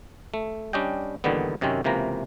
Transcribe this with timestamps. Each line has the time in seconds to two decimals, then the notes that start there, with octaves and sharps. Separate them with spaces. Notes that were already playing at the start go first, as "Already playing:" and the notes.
0.34 A3
0.73 G3 C#4 D4 D#5 G5
1.24 E2 A#2 D3 D#3 G3 B3
1.61 F#2 C3 D#3 C4 C#4
1.84 C#2 C3 E3 A#3 A#5